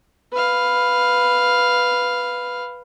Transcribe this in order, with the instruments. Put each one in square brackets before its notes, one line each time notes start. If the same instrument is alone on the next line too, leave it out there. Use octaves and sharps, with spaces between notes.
[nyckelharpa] B4 F5